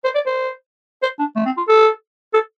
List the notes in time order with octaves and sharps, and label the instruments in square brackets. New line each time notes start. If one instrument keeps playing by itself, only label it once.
[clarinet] C5
D5
C5
C5
D4
A3
C4
F4
A4
A4